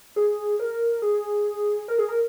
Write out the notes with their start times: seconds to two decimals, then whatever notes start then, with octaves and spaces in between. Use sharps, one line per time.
0.16 G#4
0.60 A#4
1.02 G#4
1.88 A#4
1.98 G#4
2.09 A#4